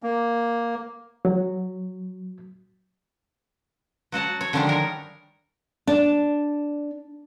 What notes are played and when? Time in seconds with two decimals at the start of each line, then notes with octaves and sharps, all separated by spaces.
0.03 A#3
1.25 F#3
4.12 F#3 F#4 F#5 A5
4.41 C#5
4.53 D3 D#3 F3 G3 G#3 D4
4.67 A#4 C#5
5.87 D4